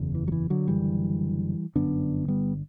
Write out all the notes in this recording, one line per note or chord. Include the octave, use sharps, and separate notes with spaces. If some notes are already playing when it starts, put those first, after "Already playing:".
Already playing: F#1 E2 C#3
E3
F#3
E3
D3 F#3
F#1 F#2 D3 E3 G3
G1 F#2 D3 B3 D4
G3 B3